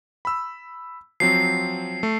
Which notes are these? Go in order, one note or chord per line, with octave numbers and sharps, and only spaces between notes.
B5 E6
F3 F#3 C4 C7
A3